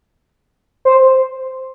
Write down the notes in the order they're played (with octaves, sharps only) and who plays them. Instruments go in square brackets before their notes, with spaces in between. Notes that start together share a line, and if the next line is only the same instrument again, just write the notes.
[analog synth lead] C5